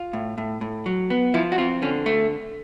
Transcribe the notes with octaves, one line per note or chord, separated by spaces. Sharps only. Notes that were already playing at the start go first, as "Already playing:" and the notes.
Already playing: F4
A2
A2
A2
F#3
B3
F3 E4
F#4
C4 F4
D3 C#4
A3